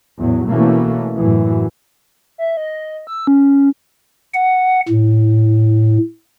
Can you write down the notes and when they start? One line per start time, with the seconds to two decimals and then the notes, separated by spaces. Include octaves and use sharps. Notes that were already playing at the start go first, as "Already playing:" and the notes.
0.18 E2 A2 F#3
0.49 B2 E3 A3 A#3 C#4
1.17 F#2 A2 E3
2.38 E5
2.57 D#5
3.07 E6
3.27 C#4
4.34 F#5
4.89 A2